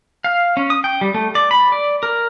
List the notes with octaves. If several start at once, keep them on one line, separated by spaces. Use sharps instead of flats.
F5
C#4
D#6
G5
G3
A3
D5
B5
D5
A#4